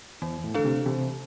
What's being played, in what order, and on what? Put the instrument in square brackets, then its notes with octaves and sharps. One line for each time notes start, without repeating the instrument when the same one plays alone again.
[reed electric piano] E2 [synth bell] E3
[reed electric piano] A2
[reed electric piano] D3 [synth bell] A3 D4 A4
[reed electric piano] C3
[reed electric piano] C3 [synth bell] E3